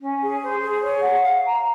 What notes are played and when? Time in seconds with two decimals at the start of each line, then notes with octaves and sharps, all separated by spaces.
0.02 C#4
0.22 G#4
0.42 C5
0.62 G#4
0.83 C#5
1.02 F#5
1.23 F5
1.43 A#5